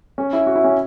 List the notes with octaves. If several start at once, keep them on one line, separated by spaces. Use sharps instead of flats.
C#4
E4
F#4
E4
C#4